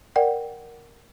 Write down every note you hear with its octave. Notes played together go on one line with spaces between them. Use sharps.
A#4 D5 F#5 G5